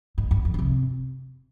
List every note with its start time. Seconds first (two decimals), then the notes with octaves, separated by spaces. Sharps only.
0.18 G#2
0.31 G2
0.45 F2
0.54 C#3
0.59 C3